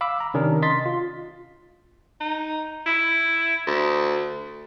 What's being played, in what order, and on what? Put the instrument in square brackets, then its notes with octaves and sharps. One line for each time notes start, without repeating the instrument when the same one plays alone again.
[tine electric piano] F5 B5 D6 E6
A#5
C3 D#3 C#4 D4 A#4
D#5 C6 A6 B6
F4
[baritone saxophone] D#4
E4
D2